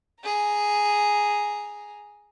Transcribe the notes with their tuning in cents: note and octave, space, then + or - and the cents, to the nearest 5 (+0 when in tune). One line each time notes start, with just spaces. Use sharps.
G#4 +0 A#5 +0